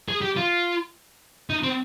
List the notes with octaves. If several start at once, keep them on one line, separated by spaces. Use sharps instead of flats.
G#4
G4
F4
D#4
C4